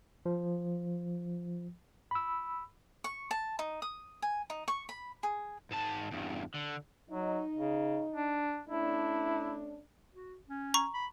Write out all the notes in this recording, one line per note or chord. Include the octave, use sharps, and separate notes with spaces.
F3
B5 E6
C#6
A5
D#4
D#6
G#5
D#4
C#6
B5
G#4
G#2 A5
E2 G2
D3
F#3 D#4
C#3
D4
A3 C#4 D4 E4
F#4
C#4
A#5 C#6
B5